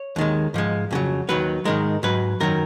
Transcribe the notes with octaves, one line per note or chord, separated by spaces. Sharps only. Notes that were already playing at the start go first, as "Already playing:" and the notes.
Already playing: C#5
D#2 D#3 G#3
G#2 F3 G#3
F2 C#3 F#3
D#2 D#3 F#3 B4
G#2 D#3 G#3 A#4
G#2 F#3 B4
F#2 D#3 F#3 A#4